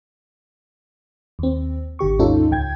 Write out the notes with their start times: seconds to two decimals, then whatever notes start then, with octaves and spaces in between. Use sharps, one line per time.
1.39 D#2 C4
1.99 G#1 D3 G4 C#6
2.19 D#2 G#2 C#4 D#4 F4 A4
2.51 C#2 G5 G#6